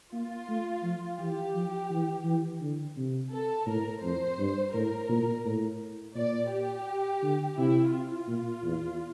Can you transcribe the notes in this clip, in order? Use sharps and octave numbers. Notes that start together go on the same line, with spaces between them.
A#3 F4
A3
F3
E3 G4
F3
E3
E3
D3
C3
A4
A2 A#4
F2 C5
G2
A2 A#4
A#2
A2
A#2 D5
G4
D3
C3 E4
F4
A#2
E2